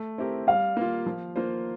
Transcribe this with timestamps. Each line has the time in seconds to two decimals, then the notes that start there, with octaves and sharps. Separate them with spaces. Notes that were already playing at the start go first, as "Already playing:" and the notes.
Already playing: A3
0.18 C4 E4 G4 A#4
0.47 G3 F5
0.77 A#3 F4
1.06 F3
1.36 A#3 F4 C5